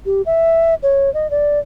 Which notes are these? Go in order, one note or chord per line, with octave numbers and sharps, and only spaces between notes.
G4
E5
C#5
D#5
D5